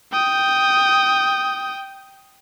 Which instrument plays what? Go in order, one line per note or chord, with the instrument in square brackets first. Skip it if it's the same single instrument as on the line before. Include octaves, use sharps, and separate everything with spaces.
[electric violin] G5 D#6